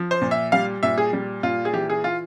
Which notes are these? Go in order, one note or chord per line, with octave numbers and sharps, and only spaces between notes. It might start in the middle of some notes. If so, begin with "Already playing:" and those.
Already playing: F3
C5
A#2
E5
G3 F5
A#2 E5
G#4
G3
A#2 F4
G#4
E3 G4
G#4
F4